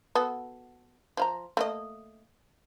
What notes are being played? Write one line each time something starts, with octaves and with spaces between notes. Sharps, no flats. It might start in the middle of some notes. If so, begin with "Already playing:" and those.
B3 F#4 A4
F3 F5 A#5
A3 A#3 D#5